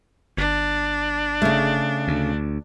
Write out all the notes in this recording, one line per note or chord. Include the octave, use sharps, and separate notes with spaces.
G1 D4
C#3 A3
D2